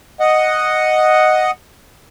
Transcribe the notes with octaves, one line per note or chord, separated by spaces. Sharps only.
D#5 F#5